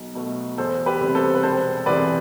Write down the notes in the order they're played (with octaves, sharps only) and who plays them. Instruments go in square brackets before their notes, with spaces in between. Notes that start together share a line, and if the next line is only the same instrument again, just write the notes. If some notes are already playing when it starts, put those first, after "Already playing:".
Already playing: [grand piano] B1
B2 A3
E2 A4 C5
G4 B4
C3 G3
A4 C5
B4
E1 A4 C5
E2 C3 E3 B4 D5